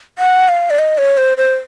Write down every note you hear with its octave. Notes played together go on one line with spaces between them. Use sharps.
F#5
F5
D5
D#5
C#5
C5
C5